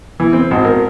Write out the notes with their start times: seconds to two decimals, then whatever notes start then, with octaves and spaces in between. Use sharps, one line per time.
0.20 E3
0.33 C4
0.51 G#1
0.65 A#4